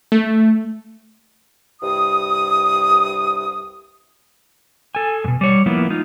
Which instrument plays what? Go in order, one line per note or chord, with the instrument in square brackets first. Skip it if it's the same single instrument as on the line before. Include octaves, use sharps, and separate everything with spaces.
[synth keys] A3
[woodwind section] C2 G2 D#6
[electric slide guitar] A4 G#5
G2 B2
G3 C#5
F3 A#3 B3 E4
G#3 D#4 F4